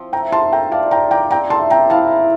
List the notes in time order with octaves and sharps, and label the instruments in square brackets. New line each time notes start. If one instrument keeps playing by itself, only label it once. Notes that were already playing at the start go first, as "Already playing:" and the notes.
Already playing: [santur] F3 C4
[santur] A3 [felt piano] G5 A#5
[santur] F4 [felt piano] A5 C6
[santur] A3 [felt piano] G5 A#5
[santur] D5 [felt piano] F5 A5
[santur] F3 [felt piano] G5 A#5
[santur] D5 [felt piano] G5 A#5
[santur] C4 [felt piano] G5 A#5
[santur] A3 [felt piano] A5 C6
[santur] C4 [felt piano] G5 A#5
[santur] E4 [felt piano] F5 A5
[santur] E4